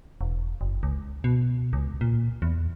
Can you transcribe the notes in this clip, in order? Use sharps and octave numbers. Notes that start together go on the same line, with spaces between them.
E1
F#1
C#2
B2
C#2
A#2
E2